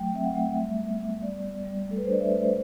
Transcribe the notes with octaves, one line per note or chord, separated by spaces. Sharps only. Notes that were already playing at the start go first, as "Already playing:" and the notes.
Already playing: F#3 A3 G5
C4 E5
F#5
A3
G3 E5
B3
G3
G3 D5
B3
G3
A3 A4
B4
C5
D4 D5
E5
A3 B4
C5